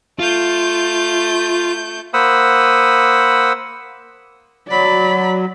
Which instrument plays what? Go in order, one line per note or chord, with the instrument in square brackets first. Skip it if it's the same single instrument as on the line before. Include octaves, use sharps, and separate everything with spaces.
[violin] A3 G6 [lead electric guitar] F4
[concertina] A#3 C5 F#5 B5 D#6 E6
[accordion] F#3 [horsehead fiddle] D5 B5